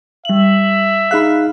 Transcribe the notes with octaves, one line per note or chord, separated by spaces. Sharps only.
G3 E5 F#7
D#4 G#4 F5 B5 F6 F#6